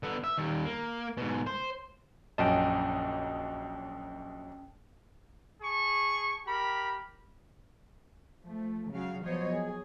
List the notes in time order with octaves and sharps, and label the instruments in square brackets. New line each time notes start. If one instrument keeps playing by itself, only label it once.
[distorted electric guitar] D3 B3
E5
D#3 G3
A#3
G#2 B2
C5
[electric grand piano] A#1 F#2 D#5 [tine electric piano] C#4 G5 A5
[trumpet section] G#4 A5 C#6
G4 A#4 B5
[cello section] F3 A3
C#3 F#3 F#4 F5
F3 F#3 B3 C5 C#5 D#5
G#4